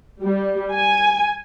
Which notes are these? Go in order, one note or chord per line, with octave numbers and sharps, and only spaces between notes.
G3
G#5